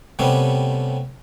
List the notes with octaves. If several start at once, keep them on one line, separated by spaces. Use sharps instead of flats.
C3 G3 A3 B3 C#4